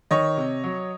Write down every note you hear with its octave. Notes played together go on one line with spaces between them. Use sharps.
D#3 C#5 D#5
C3
F#3